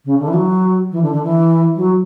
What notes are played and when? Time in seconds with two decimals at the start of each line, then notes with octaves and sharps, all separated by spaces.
0.05 C#3
0.19 D3
0.27 E3
0.33 F#3
0.91 E3
1.02 D3
1.12 D3
1.23 E3
1.76 F#3